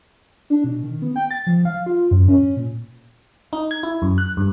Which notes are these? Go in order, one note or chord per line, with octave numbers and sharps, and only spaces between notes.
D4
B2
D#3
B3
G5
A6
F3
F5
F4
F#2
C#4
A#2
D#4
G#6
E4
F#2
F#6
G2